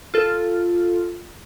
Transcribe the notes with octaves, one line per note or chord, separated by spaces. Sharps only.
F4 A4